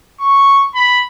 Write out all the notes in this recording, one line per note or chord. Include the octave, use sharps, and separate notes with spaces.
C#6
B5